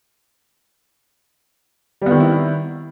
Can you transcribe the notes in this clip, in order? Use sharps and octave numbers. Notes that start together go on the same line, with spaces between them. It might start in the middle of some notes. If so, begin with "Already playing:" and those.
D#3 G3 B3 C4 E4